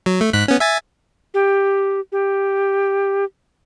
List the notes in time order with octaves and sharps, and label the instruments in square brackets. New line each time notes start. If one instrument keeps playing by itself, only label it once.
[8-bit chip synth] F#3
A3
G#2 F#6 B6
B3 C#4
E5 G#5 A6
[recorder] G4
G4